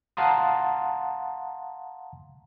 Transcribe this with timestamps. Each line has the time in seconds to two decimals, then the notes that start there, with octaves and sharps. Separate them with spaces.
0.17 F5 F#5 A5 A#5 C6 D#6